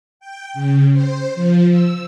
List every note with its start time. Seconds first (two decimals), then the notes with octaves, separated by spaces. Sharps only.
0.20 G5
0.54 C#3
0.93 C5
1.35 F3
1.69 E6